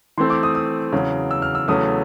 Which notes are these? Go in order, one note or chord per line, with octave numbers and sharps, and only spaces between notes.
E3 A3 C4 C6
D6
D#6
D#6
E2 C#3 F#3
E6
F6
E6
E2 C#3 F#3 A3 D#6